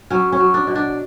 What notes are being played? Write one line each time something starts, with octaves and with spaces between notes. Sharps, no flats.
F#3 C#4
C#4
F#3
D4
B2
D4